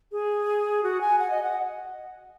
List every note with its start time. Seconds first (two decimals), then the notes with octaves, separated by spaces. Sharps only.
0.12 G#4
0.83 F#4
1.01 G#5
1.19 F#5
1.30 D#5
1.43 F#5